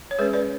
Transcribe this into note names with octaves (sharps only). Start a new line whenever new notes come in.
C#5
G#3 C#4 G#4 B4
B4 D5